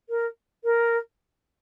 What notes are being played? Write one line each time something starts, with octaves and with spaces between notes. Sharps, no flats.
A#4
A#4